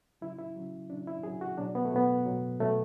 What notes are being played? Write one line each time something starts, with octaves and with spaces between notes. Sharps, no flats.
C#3 F#3 E4
E4
C#3 F#3
C#3 F#3 D4
E4
C#3 F#3 G#4
F#4
B2 F#3 D4
B3
A3
B2 F#3 B3
B2 F#3
B2 F#3 A3